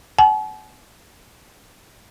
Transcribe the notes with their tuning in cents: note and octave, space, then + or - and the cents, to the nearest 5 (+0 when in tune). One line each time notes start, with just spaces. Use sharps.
F#5 +40 A5 -45